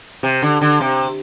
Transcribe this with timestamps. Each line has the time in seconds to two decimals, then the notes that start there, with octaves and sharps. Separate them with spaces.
0.23 C3
0.42 D3
0.61 D3
0.81 C3